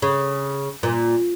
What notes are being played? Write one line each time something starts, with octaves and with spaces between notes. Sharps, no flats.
C#3
A#2